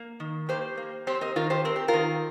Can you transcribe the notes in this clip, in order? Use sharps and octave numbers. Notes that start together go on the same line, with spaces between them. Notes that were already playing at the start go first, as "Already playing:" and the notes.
Already playing: A#3
D#3
A#3 G4 C5
A#3
C4 G4 C5
A#4 D#5
D#3 F4 A#4
G4 C5
C4 A#4
G4
F4 A#4
D#3